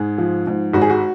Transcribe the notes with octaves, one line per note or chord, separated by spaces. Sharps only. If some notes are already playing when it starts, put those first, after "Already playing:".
Already playing: G#2 G#4
F3
G#2
G#1 F#4
G#4
F#4